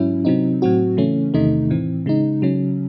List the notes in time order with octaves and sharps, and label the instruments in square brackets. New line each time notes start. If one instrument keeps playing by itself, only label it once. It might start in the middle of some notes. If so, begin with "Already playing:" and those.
Already playing: [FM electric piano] G#2 F#3 C#4 E4
C3 F#3 C4 D#4
A2 F#3 C4 F#4
C#3 E3 A3 C#4
E2 C3 D#3 A3 D#4
A2 E3 C4
C#3 G#3 D#4
C#3 F#3 C#4